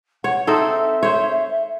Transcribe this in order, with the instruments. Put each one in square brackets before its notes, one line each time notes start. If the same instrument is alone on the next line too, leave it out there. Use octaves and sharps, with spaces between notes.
[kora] C#5 [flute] F#5
[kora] C4 D#4 A4 [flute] E5
[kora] C5 C#5